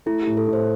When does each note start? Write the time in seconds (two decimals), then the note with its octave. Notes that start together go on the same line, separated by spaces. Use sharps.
0.06 A3 E4
0.22 G4
0.27 A2
0.37 A4
0.48 A2
0.53 C5